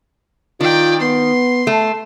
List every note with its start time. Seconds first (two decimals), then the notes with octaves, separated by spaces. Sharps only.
0.61 D#3 F4 D5 G5
1.01 B3 C6
1.67 A3